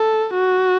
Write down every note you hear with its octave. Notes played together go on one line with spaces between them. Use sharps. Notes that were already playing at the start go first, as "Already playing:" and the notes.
Already playing: A4
F#4